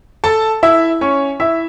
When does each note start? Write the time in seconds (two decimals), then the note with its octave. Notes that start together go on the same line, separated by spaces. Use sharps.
0.24 A4 A5
0.63 E4 E5
1.01 C#4 C#5
1.40 E4 E5